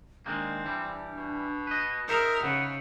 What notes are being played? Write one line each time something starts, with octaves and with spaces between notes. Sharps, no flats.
D#3 G#3 A#3 C4 D4
E3 G3
B2
B4 D#5
D#4 G#4 A#4 C5 E5 D#6
C#3 B3